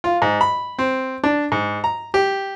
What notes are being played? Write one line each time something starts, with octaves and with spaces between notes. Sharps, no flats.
F4
G#2
B5
C4
D4
G#2
A#5
G4